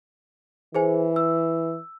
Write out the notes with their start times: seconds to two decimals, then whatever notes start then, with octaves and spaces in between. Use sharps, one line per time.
0.75 E3 G#4 C5 G#5
1.16 E6